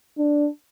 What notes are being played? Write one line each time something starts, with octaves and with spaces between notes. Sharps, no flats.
D4